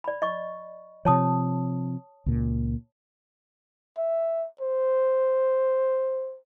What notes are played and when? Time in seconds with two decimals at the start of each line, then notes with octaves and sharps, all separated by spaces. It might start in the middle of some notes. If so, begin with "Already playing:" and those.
0.04 D5 B5
0.22 D#5 C#6
1.05 C3 F3 C#5 A5 D#6
2.26 C#2 A#2
3.98 E5
4.61 C5